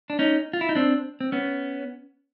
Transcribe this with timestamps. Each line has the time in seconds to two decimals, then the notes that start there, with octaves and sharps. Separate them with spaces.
0.10 D4
0.19 C#4 D#4
0.53 F4
0.61 E4
0.69 D#4
0.75 C4 D4
1.21 C4
1.32 B3 C#4